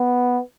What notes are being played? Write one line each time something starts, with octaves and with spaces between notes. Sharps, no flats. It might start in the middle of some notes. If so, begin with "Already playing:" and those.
Already playing: B3